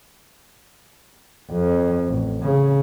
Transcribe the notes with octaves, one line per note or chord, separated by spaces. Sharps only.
F2
A1
C#3